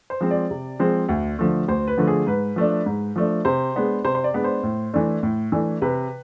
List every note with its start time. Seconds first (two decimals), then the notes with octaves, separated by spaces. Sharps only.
0.10 C5
0.21 F3 G#3 C4
0.31 D5
0.51 C3
0.79 F3 G#3 C4
1.09 D2
1.39 D3 F3 A3
1.68 D2 C5
1.87 B4
1.97 D3 F3 A3
2.08 G#4
2.27 G#2 B4
2.56 F3 A3 D4
2.86 G#2
3.16 F3 A3 D4
3.45 C3 C5
3.75 G#3 B3 D4
4.04 C3 C5
4.15 C5
4.24 D5
4.34 G#3 B3 D4
4.44 C5
4.63 A2
4.94 E3 A3 D4
5.23 A2
5.52 E3 A3 D4
5.82 C3 B4